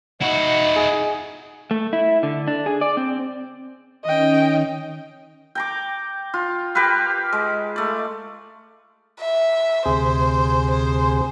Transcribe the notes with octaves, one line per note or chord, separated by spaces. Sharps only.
D#4 E4 F#4 F#5
G#4
A3
E4
D3
D4
G#4
D5
C4
D#3 C#4 D#5 G5
G5 A#5 D6
F4
G4 A#4 B4 F5
G#3
A3 D5
E5
D2 C3 G#4 C5
C5